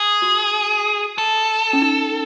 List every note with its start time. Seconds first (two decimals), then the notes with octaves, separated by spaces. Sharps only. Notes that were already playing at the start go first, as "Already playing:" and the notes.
Already playing: G#4
0.22 F#4
1.18 A4
1.73 C#4
1.82 D#4